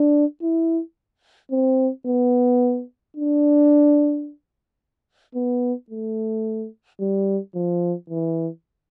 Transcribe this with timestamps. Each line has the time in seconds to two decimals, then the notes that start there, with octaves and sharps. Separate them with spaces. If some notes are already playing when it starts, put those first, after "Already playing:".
Already playing: D4
0.42 E4
1.51 C4
2.06 B3
3.16 D4
5.35 B3
5.90 A3
7.00 G3
7.55 F3
8.10 E3